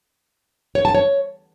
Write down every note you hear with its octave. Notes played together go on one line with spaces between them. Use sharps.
C#5
A5
C#5